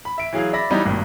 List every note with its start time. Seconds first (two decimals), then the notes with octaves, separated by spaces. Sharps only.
0.05 B5
0.18 E5 D7
0.33 E3 F#3 G#4 F5
0.53 D5 E5 B5 A#6
0.70 E3 F#3 G3 B3 D#4
0.85 G#1 G2 A#3